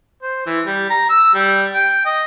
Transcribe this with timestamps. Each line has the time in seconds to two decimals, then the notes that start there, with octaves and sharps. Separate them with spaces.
0.23 C5
0.46 E3
0.65 G3
0.90 A#5
1.10 E6
1.34 G3
1.74 G5
2.06 D#5